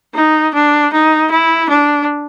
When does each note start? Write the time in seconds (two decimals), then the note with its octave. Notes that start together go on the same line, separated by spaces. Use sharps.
0.15 D#4
0.54 D4
0.93 D#4
1.31 E4
1.69 D4